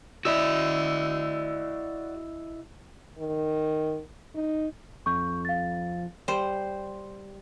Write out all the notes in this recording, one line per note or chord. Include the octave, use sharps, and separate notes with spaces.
E4 F#4 D5 D#5 E6
D#3
D#4
F2 C#6 G6
F5 A6
G3 C5